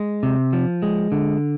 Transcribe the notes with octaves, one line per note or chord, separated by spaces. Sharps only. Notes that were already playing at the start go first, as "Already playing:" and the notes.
Already playing: G#3
C3
F3
G#3
D3